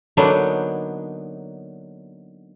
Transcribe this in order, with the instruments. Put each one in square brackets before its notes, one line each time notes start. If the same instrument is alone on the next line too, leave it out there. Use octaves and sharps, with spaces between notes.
[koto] D3 F#3 A#3 B3 D4 D#4